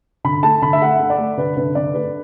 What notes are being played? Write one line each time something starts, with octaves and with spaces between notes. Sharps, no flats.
D3 B5
A3 A5
D3 B5
E5
A3 F#5
A3
D5
A3
D3 B4
D3 B4
D3 D5
A3 B4